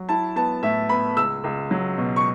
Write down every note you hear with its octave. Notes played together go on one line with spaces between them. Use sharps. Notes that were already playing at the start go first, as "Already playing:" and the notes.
Already playing: F#3
E4 A5
B3 A5
A2 E5
B3 B5
C#2 E6
C#2
F#3
B2
C#6